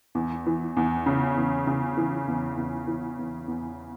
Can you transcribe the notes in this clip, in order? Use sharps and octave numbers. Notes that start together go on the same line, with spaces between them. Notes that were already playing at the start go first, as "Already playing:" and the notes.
E2
E3
E2
C#3
E2
C#3
E3
E2
E2
E3
E2
E2